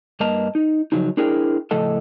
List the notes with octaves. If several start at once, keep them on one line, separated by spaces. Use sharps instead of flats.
G2 A#3 D#5 A5 A#5
D#4
C#3 F3 F#3 D#4
D4 E4 G#4 A#4 C5 G5
A2 C#3 F3 A4 D#5 A5